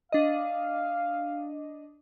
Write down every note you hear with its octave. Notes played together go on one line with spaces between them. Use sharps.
D4 D#5 F5